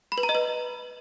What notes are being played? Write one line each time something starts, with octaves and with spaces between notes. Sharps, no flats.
B5
B4
A#5
D#5
B4